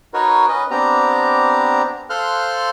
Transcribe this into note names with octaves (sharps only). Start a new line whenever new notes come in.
D#4 F#4 A#4 B4 C#5
C#4 B4 D#5
B3 C4 D4 G4 A#5
A4 C5 F5 C6 F6 F#6